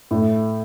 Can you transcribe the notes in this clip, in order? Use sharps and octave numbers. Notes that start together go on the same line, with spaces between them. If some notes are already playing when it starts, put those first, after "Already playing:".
A2